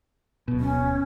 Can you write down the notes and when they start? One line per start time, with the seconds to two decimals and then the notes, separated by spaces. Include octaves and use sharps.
0.48 D1 B2
0.60 C#4